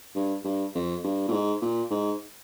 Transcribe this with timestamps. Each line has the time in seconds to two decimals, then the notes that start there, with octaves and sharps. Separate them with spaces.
0.15 G2
0.45 G2
0.75 F2
1.04 G2
1.28 A#2
1.32 G#2
1.62 A#2
1.91 G#2